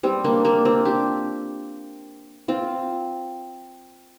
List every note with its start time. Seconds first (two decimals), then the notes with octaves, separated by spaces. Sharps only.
0.03 G3 C4
0.24 A#3 D4
0.45 A#3 D4
0.65 C4 F4
0.85 D4 G4
2.48 C4 F4